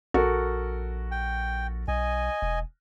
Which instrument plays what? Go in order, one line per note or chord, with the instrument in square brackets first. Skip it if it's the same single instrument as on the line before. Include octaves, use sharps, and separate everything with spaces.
[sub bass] A#1 [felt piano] F#4 A4 A#4
[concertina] G5
[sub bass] B1 [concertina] D#5 G#5
[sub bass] E1